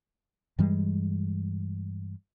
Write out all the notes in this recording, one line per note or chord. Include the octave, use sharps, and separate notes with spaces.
G2 E3 G3 G#3